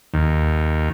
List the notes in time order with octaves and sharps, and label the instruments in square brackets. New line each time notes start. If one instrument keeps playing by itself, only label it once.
[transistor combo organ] D#2